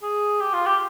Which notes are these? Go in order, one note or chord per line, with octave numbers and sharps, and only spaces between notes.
G#4
G4
F4
G4